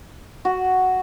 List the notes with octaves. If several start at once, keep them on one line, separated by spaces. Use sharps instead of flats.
F#4